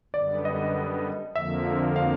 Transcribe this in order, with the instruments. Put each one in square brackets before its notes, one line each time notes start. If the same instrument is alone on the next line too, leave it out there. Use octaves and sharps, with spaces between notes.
[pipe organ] F#2 D3 G3 B3 [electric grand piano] D5
[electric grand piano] D#5
[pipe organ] F2 D3 F3 A#3 [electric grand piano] E5
[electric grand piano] F5